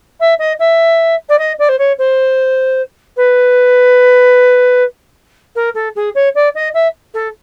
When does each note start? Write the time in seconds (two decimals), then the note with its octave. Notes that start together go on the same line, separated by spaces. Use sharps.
0.20 E5
0.39 D#5
0.59 E5
1.29 D5
1.38 D#5
1.59 D5
1.69 C5
1.79 C#5
1.98 C5
3.17 B4
5.55 A#4
5.75 A4
5.96 G#4
6.15 C#5
6.35 D5
6.55 D#5
6.74 E5
7.14 A4